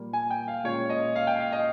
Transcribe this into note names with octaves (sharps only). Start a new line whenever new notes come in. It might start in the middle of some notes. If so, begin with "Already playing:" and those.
Already playing: A#2 G3 A#3
G#5
G5
F5
A#2 G#3 C#4 F4 C#5
D#5
F5
G5
F5
D#5